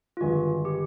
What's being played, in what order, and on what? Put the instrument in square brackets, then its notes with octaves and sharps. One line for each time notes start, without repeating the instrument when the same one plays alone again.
[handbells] F4
[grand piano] G1 G2 D#3 G#3 [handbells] F#4
[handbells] G4